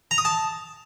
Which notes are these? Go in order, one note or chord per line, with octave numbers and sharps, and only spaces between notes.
A#5
D#6
A5